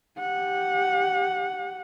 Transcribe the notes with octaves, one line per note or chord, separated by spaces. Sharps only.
G4 F#5